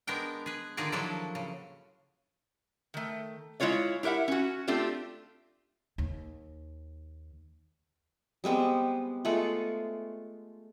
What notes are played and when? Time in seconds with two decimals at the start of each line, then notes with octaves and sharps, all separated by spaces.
0.07 G#3 B3 D4 A#4 G5
0.46 G#4 B4
0.77 D3 D#3 D#4 F4 G#4 D5
0.92 F3 F#3 A#3 D4 E4 A4
1.35 C#3
2.94 D#3 A3
3.60 G#3 E4 F4 C#5 D5
4.03 E4 G4 A#4 E5 F#5
4.28 C#4 F#4
4.68 A3 C4 D4 F4 G4
5.98 D#2
8.44 G3 G#3 B3 C4
9.25 G#3 A3 F4 F#5